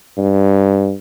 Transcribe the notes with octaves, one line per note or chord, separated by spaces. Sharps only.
G2